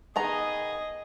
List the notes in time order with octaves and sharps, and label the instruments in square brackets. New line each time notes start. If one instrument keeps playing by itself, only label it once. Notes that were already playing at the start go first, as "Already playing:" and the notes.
[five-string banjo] D#3 B3 A#5 [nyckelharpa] G#4 D#5